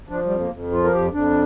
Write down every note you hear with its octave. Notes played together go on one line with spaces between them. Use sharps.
F3 D4
G3
F2
A#3
F2
F3 F4
A#4
F2 G4
F2 D4